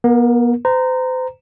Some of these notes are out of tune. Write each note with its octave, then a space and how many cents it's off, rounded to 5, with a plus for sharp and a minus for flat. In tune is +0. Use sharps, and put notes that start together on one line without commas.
B3 -40 A#4 +0
C5 -35 A#5 -5